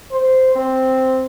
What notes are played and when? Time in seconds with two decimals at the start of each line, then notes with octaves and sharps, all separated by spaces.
0.11 C5
0.56 C4